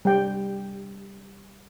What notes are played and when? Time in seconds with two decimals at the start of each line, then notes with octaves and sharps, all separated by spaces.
0.05 G3 G5